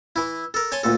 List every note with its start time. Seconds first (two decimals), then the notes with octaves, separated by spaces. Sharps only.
0.16 E3 E4
0.54 A4 A#4
0.72 C#5 G#5 A5 C6
0.83 D2 A#2 A4